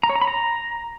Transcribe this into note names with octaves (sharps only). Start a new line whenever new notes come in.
A#5
C#5
A#5
B5
A#5